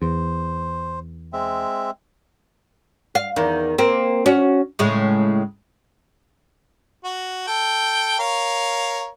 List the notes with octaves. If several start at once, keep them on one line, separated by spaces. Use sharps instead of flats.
E2 C5
G#3 C4 E5
F5
E2 D#3
A#3 C4
C#4 F#4
A2 C#3 G#3
F#4
A4 G5
A#4 C#5 F5